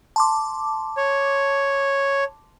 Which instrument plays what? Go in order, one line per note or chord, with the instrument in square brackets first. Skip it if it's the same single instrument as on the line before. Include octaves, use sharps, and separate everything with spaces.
[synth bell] A5 C6 D6
[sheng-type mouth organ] C#5